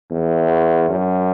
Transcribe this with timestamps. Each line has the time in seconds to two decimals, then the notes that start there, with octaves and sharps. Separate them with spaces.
0.11 E2
0.90 F#2